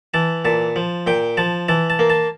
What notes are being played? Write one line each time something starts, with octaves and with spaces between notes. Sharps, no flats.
E3 A5
A#2 A5
F3
A#2 G5
F3 A5
E3 A5
A5
A#3
A5